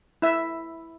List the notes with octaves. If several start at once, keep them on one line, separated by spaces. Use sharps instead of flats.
E4 E5